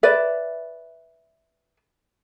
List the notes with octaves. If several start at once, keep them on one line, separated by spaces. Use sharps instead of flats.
B4 D5 E5